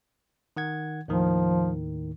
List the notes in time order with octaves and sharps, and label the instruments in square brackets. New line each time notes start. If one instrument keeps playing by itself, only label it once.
[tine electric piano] D#3 F#5 G#6
[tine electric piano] D#2 A2 D#3 [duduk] F3